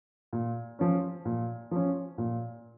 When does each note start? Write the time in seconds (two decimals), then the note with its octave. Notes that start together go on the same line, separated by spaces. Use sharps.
0.33 A#2
0.79 F3 C#4
1.25 A#2
1.71 F3 C#4
2.18 A#2